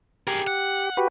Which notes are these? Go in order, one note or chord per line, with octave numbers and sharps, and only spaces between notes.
G4 G#4 A#4
F#5
F#4 G4 B4